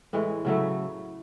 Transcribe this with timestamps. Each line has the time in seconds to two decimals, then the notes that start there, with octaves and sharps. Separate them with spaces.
0.13 A2 E3 G#3
0.45 C#3 F#3 A3 E4